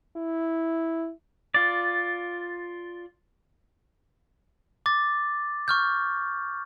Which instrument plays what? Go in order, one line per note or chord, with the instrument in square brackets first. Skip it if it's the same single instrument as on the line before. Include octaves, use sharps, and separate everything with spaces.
[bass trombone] E4
[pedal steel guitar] F4 D5
[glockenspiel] D6 A6
C#6 F6 G6